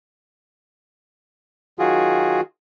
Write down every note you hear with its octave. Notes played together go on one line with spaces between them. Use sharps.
D#3 F#3 F4 F#4 G#4